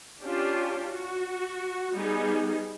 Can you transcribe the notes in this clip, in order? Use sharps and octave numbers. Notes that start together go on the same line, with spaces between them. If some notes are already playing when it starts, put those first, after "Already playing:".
C#4 D4 F4 G4
F#4
G3 B3 D#4 G#4